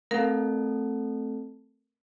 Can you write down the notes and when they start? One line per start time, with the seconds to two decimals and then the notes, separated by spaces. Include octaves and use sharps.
0.11 A3 C4 A4 A#4 F5